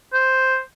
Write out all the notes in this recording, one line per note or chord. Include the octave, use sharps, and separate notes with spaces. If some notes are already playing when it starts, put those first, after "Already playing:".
C5